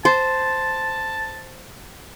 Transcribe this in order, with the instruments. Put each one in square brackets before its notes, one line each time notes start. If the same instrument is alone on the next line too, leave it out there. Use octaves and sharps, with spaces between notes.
[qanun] C5 [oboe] A5